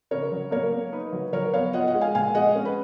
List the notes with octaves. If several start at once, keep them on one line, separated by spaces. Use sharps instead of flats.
C#3 A#4 C#5
F#3
A#3 A#4 C#5
A#3
D#4 B4
F#3
F#3 A#4 C#5
B3 C#5 F5
F4 D#5 F#5
D#5 F#5
G#3
F5 G#5
A#2 F5 G#5
G#3 D#5 F#5
C#4
B4